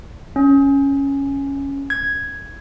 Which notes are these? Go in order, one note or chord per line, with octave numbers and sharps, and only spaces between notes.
C#4
G#6